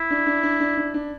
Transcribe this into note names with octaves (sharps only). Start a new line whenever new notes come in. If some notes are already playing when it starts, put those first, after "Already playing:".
Already playing: E4
D4
D4
D4
D4
D4
D4